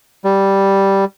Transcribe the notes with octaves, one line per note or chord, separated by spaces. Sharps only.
G3